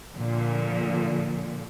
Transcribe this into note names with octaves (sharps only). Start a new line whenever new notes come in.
A#2 D3 F3